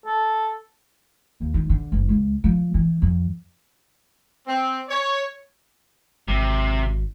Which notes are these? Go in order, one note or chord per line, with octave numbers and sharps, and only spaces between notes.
A4
D#2
D#3
D3
F#1
C#2
F3
E3
F2
C4
C#5
G#1 C3